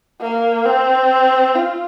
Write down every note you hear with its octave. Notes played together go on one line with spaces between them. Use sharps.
A#3
C4
F4